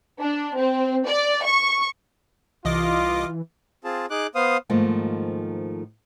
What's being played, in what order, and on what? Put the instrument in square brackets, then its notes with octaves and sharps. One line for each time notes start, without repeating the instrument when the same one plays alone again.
[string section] D4
C4
D5
C#6
[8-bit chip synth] C2 D#5 D6 [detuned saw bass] E3 [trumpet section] F4
[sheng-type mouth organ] C4 F4 G#4 A5
D#4 G#4 D6 F#6
B3 C5 F5 D#6
[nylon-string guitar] G#2 D#3 F3 A3 A#3